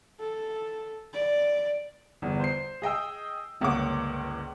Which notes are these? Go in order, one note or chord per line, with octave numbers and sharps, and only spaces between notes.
A4
D5
G1 E2
C5 C7
G#4 D#5 G5 E6
G1 C#2 A#3 C#5 F#5 D6